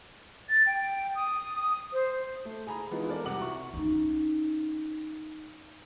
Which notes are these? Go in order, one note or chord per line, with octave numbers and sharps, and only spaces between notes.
A6
G5
D#6
C5
A3
G#4 G#5 A#5 B5
E3 G#3 B3 D#4 F4
A4 A#4 D5
C2 C3 F#5 A#5 D6 F#7
E4 F#4 E5 C#6
C#4 D#4